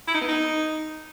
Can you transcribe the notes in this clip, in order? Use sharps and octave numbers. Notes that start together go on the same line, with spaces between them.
E4
D#4
B3
D#4